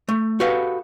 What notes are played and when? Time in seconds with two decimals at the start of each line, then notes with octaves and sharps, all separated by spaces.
0.09 A3
0.40 F#4 G4 A4 B4 F5